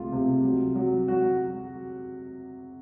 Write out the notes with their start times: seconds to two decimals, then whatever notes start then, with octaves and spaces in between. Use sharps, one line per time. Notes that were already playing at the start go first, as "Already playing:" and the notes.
Already playing: C#2 C3 A3 F4
0.12 C3
0.44 F#3
0.75 F#3
1.07 F#3 F#4